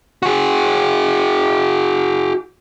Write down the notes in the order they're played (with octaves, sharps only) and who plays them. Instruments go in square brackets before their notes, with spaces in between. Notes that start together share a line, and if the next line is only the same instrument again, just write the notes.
[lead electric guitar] F#4 G#4